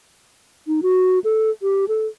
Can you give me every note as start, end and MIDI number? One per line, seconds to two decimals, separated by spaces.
0.67 0.80 63
0.83 1.19 66
1.24 1.50 69
1.62 1.85 67
1.88 2.07 69